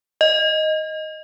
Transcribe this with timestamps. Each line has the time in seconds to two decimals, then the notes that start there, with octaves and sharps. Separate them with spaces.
0.21 D#5